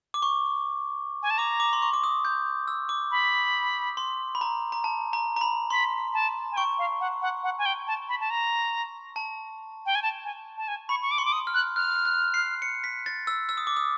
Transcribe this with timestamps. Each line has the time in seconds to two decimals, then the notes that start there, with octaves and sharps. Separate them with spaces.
0.14 D6
0.22 C#6
1.23 G#5
1.30 A5
1.38 A#5 D6
1.60 D6
1.73 C6
1.82 C#6
1.93 D6
2.04 D#6
2.25 G6
2.68 E6
2.89 D6
3.11 B5
3.97 C6
4.35 B5
4.41 A#5
4.72 A#5
4.84 A5
5.13 A#5
5.36 A#5
5.41 B5
5.70 B5 C6
6.14 A5
6.52 G#5
6.57 G5 C#6
6.79 F5
7.00 F#5
7.22 F#5
7.43 F#5
7.59 G#5
7.66 G5
7.87 A5
8.09 B5
8.20 A5
8.30 A#5
9.16 A5
9.86 G5
9.95 G#5
10.02 A5
10.25 G#5
10.57 A5
10.68 G#5
10.89 B5 C#6
11.02 C#6
11.11 D6
11.18 C6 C#6
11.25 D6
11.32 D#6
11.47 F6
11.54 F#6
11.76 F6 F#6
12.05 F#6
12.34 C7
12.62 C#7
12.84 B6
13.06 A6
13.27 E6
13.49 E6
13.57 D#6
13.67 D6
13.76 D#6